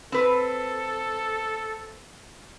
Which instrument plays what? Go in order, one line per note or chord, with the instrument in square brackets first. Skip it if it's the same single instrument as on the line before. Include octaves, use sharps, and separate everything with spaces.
[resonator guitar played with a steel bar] C4 B4 [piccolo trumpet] A4